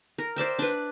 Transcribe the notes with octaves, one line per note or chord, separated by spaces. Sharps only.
A#4
C5 D5 E5 G5
D4 B4